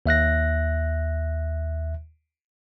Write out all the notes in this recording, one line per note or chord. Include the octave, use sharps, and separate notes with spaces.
D#2 E5 F#6 A#6